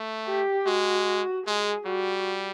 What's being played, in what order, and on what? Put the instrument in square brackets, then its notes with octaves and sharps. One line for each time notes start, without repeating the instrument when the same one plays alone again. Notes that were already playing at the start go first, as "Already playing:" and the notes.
Already playing: [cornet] A3
[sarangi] G4
[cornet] G#3 [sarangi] F#4
[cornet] G#3 [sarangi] G#4
[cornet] G3 [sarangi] F#4